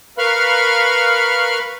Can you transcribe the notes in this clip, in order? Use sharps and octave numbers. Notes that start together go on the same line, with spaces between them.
A#4 B4 F5 B5 C#6 F6